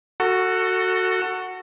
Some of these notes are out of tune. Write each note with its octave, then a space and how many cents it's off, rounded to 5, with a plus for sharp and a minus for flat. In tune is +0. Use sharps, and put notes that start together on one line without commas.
F#4 +0 A4 +30